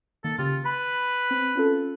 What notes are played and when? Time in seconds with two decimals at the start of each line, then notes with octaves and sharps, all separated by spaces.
0.24 D#3 A#3 A4
0.38 C#3 F4 G4
0.65 B4 B5
1.31 C4
1.55 C#4 F4 A4